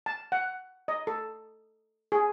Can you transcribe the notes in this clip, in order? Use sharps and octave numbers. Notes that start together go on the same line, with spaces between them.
A5
F#5
D#5
A4
G#4